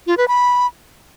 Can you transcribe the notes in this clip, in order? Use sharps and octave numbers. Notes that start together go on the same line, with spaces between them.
F4
B4
B5